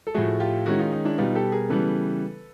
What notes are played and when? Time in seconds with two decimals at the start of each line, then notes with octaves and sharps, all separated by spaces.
0.07 A4
0.14 A2 F3 A3 F#4 G#4
0.40 F4 G4
0.66 D#3 G#3 C#4 E4 F#4
0.79 D#4 F4
0.92 D#4
1.05 D4 E4
1.18 B2 G3 B3 D#4 F4
1.35 G4 A4
1.52 G#4 A#4
1.69 C#3 E3 G3 B3 A4 B4